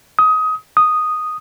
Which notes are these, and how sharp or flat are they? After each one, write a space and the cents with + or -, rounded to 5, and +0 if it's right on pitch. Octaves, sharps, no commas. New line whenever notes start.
D#6 +20
D#6 -5